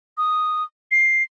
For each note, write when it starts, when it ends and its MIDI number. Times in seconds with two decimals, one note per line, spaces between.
0.18 0.63 87
0.91 1.23 96